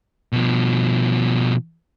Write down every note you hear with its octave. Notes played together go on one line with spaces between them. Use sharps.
B2 F3